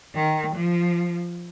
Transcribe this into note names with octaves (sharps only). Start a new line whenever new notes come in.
D#3
F3